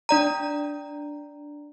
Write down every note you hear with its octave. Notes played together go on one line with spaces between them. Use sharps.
D4 D5 A#5